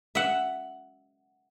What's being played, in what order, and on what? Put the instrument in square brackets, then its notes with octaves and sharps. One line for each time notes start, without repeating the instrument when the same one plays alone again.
[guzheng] E5 F#5